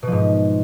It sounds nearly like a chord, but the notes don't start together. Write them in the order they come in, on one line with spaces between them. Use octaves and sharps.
B2 F3 G#2